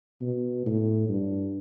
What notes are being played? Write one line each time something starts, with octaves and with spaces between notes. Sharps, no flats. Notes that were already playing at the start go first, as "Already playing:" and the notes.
B2
A2
G2